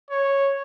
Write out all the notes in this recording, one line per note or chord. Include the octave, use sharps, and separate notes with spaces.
C#5